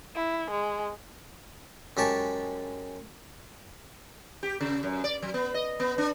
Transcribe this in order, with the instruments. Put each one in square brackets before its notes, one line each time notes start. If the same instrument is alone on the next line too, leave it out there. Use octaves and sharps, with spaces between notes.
[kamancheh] E4
G#3
[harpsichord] F#2 G#3 G4 A5 C#6
[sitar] G4
C#3
F#2
D5
F#3
B3
D#5
B3
D4